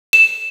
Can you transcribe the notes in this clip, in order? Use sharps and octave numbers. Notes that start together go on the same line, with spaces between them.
E7